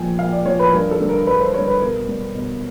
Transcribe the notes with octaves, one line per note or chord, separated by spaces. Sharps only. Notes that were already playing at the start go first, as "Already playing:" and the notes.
Already playing: A#2 F3 G5 G#5
A#2 F5
D5
F3 C#5
B4
G2 A#4
A4
D3 G3
A#4
G2 B4
C5
D3 G3 C#5
B4
B2 A#4
G3
B2